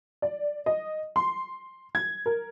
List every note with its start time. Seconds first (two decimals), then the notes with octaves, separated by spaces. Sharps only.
0.22 D5
0.66 D#5
1.16 C6
1.95 G#6
2.26 A#4